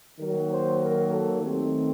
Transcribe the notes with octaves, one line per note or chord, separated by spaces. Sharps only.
D#3 F#3 A#3 A#4
C5
A#4
A4
D#3 A3 C4 G4